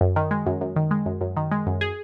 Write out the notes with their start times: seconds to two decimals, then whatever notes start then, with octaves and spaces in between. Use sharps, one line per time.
0.01 F#2
0.16 D#3
0.31 G#3
0.46 F#2
0.61 F#2
0.76 D#3
0.91 G#3
1.06 F#2
1.21 F#2
1.37 D#3
1.51 G#3
1.67 F#2
1.81 G#4